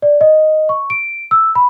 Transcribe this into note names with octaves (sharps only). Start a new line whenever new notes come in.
D5
D#5
C#6
D7
E6
B5